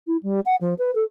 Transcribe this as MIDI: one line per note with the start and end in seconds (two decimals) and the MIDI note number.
0.07 0.17 64
0.23 0.40 55
0.46 0.56 78
0.61 0.74 53
0.78 0.93 71
0.95 1.04 69